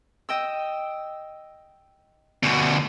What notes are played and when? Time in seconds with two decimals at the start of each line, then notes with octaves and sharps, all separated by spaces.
0.29 D#5 G5 E6
2.43 D2 B2